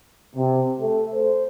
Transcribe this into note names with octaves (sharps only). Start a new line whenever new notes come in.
C3
A3
C5